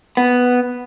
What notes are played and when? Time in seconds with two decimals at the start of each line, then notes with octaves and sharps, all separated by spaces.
0.17 B3